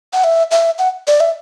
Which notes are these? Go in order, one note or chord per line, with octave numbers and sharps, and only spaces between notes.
F#5
E5
E5
F#5
D5
E5